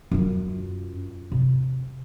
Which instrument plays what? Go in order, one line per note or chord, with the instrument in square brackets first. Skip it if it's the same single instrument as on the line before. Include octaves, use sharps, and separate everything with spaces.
[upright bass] F#2 F4
C3